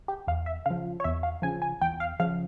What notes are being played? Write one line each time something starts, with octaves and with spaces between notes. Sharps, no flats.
G4
E2 F5
E5
C#3 F3 F5
C#5
E2 E5
F5
C#3 F3 G#5
G#5
E2 G5
F5
C#3 F3 F5